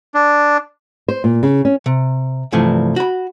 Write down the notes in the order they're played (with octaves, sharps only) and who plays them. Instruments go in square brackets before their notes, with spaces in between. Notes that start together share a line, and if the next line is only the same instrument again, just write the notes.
[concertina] D4
[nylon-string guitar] C5
A#2
C#3
C#4
[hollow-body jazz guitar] C3
C2 G2 E3 F3 A3
F#4 B5